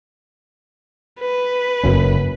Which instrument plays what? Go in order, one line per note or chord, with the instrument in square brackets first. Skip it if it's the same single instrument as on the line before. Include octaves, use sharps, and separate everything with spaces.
[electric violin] B4
[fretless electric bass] F#1 F#2 C#4